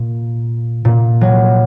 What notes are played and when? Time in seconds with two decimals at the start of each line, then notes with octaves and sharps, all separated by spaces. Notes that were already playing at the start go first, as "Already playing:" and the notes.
Already playing: A#2
0.85 A#2
1.21 F#3